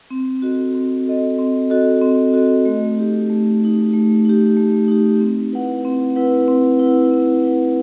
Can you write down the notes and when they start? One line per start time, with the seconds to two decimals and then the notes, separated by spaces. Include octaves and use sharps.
0.10 C4
0.42 F#4 A4 D#5
0.74 C4
1.06 F#4 A4 D#5
1.38 C4
1.70 F#4 A4 D#5
2.01 C4
2.34 F#4 A4 D#5
2.65 A3
2.97 D#4 G4
3.30 A3
3.61 D#4 G4
3.93 A3
4.25 D#4 G4
4.57 A3
4.88 D#4 G4
5.20 C4
5.52 E4 B4 F#5
5.85 C4
6.16 E4 B4 F#5
6.48 C4
6.79 E4 B4 F#5
7.11 C4
7.43 E4 B4 F#5